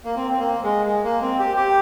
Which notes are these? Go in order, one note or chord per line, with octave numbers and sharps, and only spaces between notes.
A#3
C4
C4
A#3
G#3
G#3
A#3
C4
G4
G4